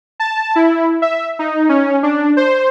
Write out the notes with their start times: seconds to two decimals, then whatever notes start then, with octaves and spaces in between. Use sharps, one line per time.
0.20 A5
0.56 E4
1.02 E5
1.39 D#4
1.69 C#4
2.03 D4
2.37 C5